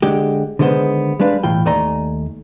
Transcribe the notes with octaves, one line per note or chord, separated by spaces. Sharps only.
D3 G#3 G4
D3 D#3 G#3 B3 C5
G3 G#3 D4 B4 F5
B1 A2 E3 F4 G5
D#2 A3 D5 G#5 A#5 C6